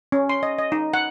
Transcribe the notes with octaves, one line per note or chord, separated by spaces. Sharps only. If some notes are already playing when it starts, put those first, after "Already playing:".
C#4
C6
D#5
D#5
D#4
F#5